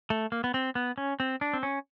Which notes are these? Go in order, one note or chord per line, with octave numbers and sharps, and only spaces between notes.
A3
A#3
B3
C4
B3
C#4
C4
D4
C4
C#4